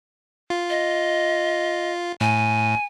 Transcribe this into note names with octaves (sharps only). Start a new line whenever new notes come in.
F4
D#5
A2 G#5